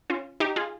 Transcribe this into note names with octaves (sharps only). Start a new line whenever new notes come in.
C#4 F4
D#4 G4
F4 G#4